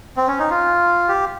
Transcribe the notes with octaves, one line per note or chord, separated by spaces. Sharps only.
C4
C#4
D#4
F4
G4